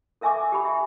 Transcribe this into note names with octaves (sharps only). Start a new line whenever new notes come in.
A4 A#4 E5 G#5 C#6 D6
G4 G#5 B5
E5